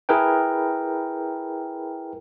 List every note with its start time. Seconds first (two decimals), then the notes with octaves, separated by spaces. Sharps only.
0.09 E4 G#4 A#4 B4 G5